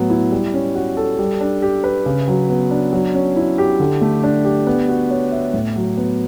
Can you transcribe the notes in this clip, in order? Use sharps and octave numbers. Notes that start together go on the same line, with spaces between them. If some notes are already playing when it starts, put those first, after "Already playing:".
Already playing: A2 F#3 B3
E4
G3
C#4
F#4
A4
G3
D4
G4
B4
C#3
F#3
B3
D4
F#3
C#4
E4
G4
D3
A3
D4
G4
B3
F#4
C#5
E5
A2
F#3
B3